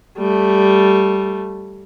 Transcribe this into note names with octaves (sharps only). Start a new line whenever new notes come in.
G3 A3